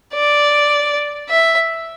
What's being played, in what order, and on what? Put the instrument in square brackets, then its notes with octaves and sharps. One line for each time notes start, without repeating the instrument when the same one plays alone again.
[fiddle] D5
E5